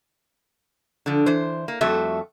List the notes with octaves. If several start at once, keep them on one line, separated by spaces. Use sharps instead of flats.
D3 F3
E3 C5
A#3
F2 G3 A3 F#4 E5